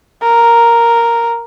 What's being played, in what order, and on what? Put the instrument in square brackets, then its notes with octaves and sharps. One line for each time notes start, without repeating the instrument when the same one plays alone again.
[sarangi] A#4